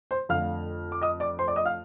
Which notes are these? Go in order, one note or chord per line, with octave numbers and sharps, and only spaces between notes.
C5 C6
F2 D3 A3 F5 F6
D6
D#5 D#6
D5 D6
C5 C6
D5 D6
D#5 D#6
F5 F6